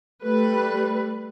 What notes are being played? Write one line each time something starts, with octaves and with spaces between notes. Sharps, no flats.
G3 A3 B4